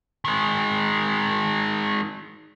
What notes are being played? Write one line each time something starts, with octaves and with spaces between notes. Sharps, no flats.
D#3 G#3